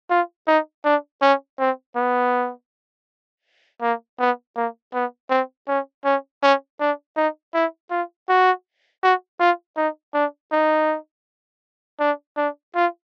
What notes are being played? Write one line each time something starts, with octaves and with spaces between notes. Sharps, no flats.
F4
D#4
D4
C#4
C4
B3
A#3
B3
A#3
B3
C4
C#4
C#4
C#4
D4
D#4
E4
F4
F#4
F#4
F4
D#4
D4
D#4
D4
D4
F4